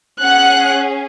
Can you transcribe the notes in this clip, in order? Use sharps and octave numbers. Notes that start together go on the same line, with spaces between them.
C#4 G#4 F#5 F#6